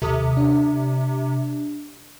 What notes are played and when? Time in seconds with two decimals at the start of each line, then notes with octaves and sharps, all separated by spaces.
0.02 D#2 C3 A4 D#6
0.37 D4